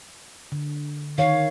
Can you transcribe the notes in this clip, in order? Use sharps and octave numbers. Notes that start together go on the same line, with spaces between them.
D3
D#3 C#5 F5